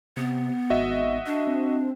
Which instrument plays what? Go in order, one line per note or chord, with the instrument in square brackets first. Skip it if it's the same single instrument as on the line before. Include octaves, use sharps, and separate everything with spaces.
[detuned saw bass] C3 [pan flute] B3
[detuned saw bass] G#1 [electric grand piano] F#4 D#5 E5
[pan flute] D4
[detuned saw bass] C4